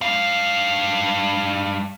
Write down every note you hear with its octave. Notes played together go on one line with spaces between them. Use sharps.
G2 F5